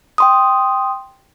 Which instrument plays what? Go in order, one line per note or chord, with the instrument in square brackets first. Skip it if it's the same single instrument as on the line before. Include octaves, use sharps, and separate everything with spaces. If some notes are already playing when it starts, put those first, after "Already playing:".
[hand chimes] G5 C6 D#6